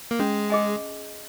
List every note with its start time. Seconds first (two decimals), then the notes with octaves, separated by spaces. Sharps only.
0.11 A#3
0.19 G#3 C#4
0.50 G#4 D#5 G#5